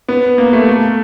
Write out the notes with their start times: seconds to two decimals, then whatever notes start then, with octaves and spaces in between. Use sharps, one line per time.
0.08 B3
0.38 A#3
0.53 A3
0.68 A3